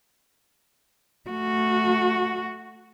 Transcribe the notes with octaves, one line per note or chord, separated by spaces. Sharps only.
A3 F#4